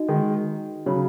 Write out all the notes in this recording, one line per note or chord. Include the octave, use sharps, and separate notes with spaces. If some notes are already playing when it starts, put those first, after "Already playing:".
Already playing: D#4 F#4 D#5
D#3 G#3
C#3 F#3 C#5 B5